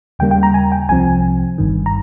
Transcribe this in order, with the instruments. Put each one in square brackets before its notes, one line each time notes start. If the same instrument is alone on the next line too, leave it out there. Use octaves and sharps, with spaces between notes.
[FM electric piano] D#2 C#3 G3 A#3 G5
G5
A#5
G#5
G5
C2 C3 F3 C4 G#5
G1 G2 D#3
A#5